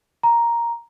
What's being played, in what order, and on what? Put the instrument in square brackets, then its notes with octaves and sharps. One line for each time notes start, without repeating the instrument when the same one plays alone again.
[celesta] A#5